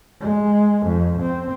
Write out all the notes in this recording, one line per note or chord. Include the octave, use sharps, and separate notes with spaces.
G#3
F2
C4